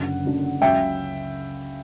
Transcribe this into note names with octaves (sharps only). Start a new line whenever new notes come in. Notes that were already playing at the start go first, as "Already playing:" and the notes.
Already playing: F#1 F#2 D3 F#5
F#1 F#2 D3
C#2 C#3 F#3 E5 G5